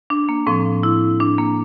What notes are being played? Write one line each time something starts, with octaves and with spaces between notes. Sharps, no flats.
D4
A#3
A2 F3 C4
E4
D4
A#3